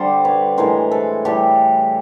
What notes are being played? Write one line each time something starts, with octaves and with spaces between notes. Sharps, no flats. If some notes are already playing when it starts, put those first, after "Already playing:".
Already playing: D3 G3 C5 D5
B4 C#5
A2 E3 G#3 A#4 C5
A4 B4
A2 E3 G3 G4 A4